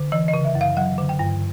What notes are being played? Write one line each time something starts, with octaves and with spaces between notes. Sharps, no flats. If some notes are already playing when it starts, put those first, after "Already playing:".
Already playing: D3
E3 D#5
D#5
C#3
E5
F#2
F5
F#3 F#5
D3
G5
G2